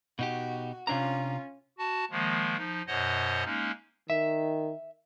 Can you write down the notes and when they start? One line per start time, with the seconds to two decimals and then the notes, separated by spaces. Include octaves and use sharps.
0.19 B2 D#4 F#4 G4
0.87 C3 C#4 D4 F4 A#5
1.78 F#4 A5
2.11 D#3 F3 G#3 A#3
2.57 F3 D#4
2.87 F#2 B2 C5 C#5 D#5 F#5
3.45 G#3 A#3 C#4 D#4
4.10 D#3 E5